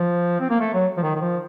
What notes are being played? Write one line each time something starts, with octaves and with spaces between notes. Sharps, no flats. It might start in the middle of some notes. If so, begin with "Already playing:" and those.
Already playing: F3
C4
A#3
A3
F#3
F3
D#3
D#3
F3